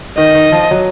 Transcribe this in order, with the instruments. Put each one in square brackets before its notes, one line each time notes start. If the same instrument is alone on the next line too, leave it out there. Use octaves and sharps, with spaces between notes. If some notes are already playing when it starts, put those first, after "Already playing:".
[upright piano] D#3 [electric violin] D#5
[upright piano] D#3
F3
F#3